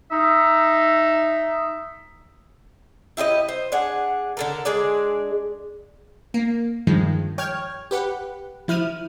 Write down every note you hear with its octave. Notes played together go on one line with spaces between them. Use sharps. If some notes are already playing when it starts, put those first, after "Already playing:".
D#4 E5
E4 G4 C5 D#5
C5
D4 G#4 F#5
D3 A4 A#4
G#3 D4 G#4 D5
A#3
G2 D#3 F3 G#3
C#5 G5 F6 G#6
G4 B4 F#5
F3 E4 F6 D#7